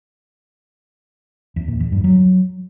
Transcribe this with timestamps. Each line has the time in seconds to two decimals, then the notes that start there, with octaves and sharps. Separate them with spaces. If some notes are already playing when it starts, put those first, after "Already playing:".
1.56 E2
1.68 A#2
1.80 E2
1.92 G2
2.04 F#3